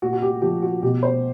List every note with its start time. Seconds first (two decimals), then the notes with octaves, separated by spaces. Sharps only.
0.02 A#2 F#4
0.13 F#4
0.22 G4
0.42 F3 G4
0.62 F#4
0.83 B2 G4
1.03 C5